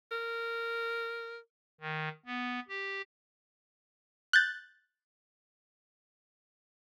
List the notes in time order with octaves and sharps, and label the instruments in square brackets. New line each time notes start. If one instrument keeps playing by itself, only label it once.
[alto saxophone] A#4
[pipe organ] D#3
B3
G4
[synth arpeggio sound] F#6 G6 A6